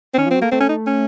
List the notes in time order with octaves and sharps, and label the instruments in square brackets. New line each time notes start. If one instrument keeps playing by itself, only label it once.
[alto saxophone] C4
[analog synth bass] D#3 [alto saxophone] C#4
[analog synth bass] F3
[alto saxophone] C4
[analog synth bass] F#3
[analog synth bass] A3 [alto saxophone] A#3
[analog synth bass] A3 [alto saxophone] C4
[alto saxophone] C#4
D#4
C#4